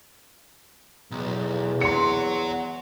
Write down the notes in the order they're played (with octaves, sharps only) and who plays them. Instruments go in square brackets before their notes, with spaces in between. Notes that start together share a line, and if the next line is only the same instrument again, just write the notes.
[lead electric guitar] B1 [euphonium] E2
[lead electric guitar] C#5 F#5 [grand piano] C6 C#7